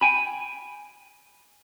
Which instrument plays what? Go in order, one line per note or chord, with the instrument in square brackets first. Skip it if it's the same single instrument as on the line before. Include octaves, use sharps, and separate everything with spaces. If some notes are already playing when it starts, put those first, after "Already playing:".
[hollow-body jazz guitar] G5 G#5 B5